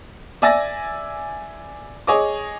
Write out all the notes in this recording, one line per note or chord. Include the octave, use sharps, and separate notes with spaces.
D5 E5 G#5 E6 A6 A#6
G#4 C#5 D#5 D6